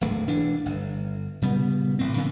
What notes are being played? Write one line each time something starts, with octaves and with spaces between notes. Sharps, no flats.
D1 G#1 D2 A3
E1 E3 D4
G1
A#2 C#3 G3 B3
A1 A2 C4
A2 C#3 E3 B3